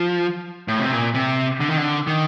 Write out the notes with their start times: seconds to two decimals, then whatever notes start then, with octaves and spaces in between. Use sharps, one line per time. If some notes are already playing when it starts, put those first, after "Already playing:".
Already playing: F3
0.68 A2
0.80 C3
0.92 A#2
1.14 C3
1.60 D3
1.69 D#3
1.77 D3
2.07 D#3